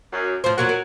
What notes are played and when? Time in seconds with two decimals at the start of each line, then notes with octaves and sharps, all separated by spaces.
0.12 F#2
0.44 A2 F3 C5
0.58 F2 A#2 F#3 A#3 F#4
0.69 A#4